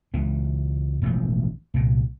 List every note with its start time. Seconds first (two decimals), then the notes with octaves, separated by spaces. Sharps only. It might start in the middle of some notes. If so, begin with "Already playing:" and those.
0.14 C#2 E3
1.02 E1 A1 D#3 F3
1.74 C2 A#2